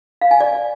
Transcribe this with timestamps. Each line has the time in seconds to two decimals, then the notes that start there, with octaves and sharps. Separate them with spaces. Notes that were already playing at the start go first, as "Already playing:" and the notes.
0.21 F5
0.31 G#5
0.41 D5